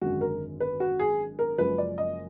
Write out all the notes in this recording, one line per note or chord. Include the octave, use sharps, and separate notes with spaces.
G#1 F#2 D3 G#3 F#4
A#4
B4
F#4
G#4
A#4
F#1 F#2 F3 G#3 B4
D5
D#5